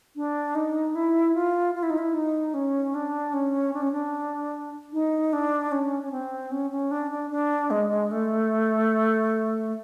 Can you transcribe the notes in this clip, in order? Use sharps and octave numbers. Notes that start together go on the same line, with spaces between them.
D4
D#4
E4
F4
F4
E4
D#4
E4
D#4
C#4
D4
C#4
D4
C#4
D4
D#4
D4
C#4
C#4
C4
C#4
C#4
D4
D4
D4
G#3
A3